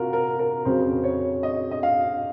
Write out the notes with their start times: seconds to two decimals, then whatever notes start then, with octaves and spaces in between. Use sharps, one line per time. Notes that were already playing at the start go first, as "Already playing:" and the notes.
Already playing: C3 F4 F#4 A#4
0.13 A#4
0.39 A#4
0.65 F2 C#3 F#3 C5
1.04 C#5
1.43 D#5
1.71 D#5
1.83 F5